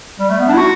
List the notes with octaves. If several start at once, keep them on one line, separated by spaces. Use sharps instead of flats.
G3
A3
B3
D4
E4
F#4